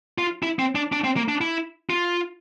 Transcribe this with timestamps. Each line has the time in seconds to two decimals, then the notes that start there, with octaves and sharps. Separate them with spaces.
0.18 F4
0.43 E4
0.59 C4
0.75 D4
0.92 D4
1.04 C4
1.17 A#3
1.28 D4
1.41 E4
1.90 F4